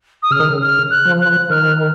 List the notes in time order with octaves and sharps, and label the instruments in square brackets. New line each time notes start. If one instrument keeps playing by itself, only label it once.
[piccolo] D#6
[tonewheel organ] C#3 [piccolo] F6
[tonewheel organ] D#3
C#3
[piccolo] F6
F#6
[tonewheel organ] F3
[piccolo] F#6
[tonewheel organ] D#3 [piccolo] F6